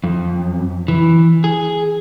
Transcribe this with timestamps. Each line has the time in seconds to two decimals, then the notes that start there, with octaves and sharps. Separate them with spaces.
0.04 F2
0.88 E3
1.44 G#4